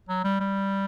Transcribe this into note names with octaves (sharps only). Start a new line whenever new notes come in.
F#3
G3
G3